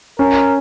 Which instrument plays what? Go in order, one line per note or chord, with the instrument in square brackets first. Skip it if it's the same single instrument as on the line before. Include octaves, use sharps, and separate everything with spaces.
[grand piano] C#4 [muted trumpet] A#4